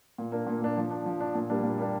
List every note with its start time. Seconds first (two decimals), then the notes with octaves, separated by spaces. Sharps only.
0.18 A#2
0.32 A#3 D4
0.47 A#2
0.61 A#3 D4
0.77 F3
0.91 D4
1.06 F3
1.20 D4
1.35 A#2
1.50 G3 A#3 D4
1.64 A#2
1.78 G3 A#3 D4